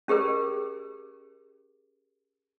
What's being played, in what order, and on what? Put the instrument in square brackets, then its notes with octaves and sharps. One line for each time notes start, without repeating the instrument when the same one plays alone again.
[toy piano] C#4 G4 G#4 A#4